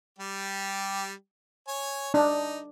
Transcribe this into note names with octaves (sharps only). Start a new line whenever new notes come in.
G3 G4
C#5 G#5
D4 D#4